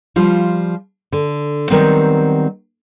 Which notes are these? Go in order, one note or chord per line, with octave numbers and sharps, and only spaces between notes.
F3 G3 F4
D3
D#3 F#3 G3 B3 C4